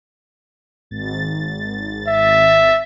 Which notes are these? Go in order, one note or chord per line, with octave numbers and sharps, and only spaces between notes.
G#1 A6
E5